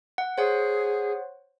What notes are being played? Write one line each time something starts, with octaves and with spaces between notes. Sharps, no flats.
F#5
G#4 C5 C#5 F#5